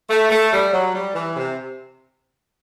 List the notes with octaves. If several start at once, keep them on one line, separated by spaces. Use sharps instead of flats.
A3
A3
G3
F#3
G3
E3
C3